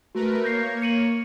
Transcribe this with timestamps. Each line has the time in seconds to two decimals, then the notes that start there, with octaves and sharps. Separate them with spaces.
0.15 A3 F#4 A#4 B4
0.44 A#3 C#5 G6 A#6 C7
0.82 C#7 D#7 F#7